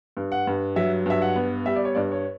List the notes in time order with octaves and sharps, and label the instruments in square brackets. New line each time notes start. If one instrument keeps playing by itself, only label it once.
[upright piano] G2
F#5
G2
F#3 E5
G2 E5
F#5
B3
G3 E5
D5
C#5
G2 D5
C#5